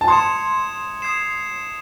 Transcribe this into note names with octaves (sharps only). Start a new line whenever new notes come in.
A5
C6 D#6 G#6 C#7 E7
D#6 G#6 C7 E7